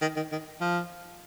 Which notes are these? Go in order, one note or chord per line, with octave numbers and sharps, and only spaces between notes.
D#3
D#3
D#3
F3